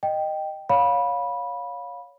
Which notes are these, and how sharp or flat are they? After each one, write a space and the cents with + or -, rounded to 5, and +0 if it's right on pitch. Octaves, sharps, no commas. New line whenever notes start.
D#5 -10 G5 +0
C#5 +15 F5 +25 B5 -15